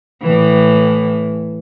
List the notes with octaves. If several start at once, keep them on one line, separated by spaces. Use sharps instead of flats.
A2 E3